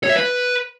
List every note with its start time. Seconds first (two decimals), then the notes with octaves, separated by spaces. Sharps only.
0.03 C#5
0.09 E5
0.15 B4